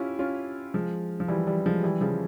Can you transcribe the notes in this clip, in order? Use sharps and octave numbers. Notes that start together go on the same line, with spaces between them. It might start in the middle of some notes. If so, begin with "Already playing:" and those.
Already playing: C#4 E4 F4 G4
C#4 F4
F3 G#3
F3
E3 G3
E3 G3
F3 G#3
E3 G3
C#3 F3